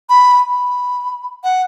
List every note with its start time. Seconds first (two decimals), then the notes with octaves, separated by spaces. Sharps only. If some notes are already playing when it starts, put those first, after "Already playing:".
0.10 B5
0.50 B5
1.44 F#5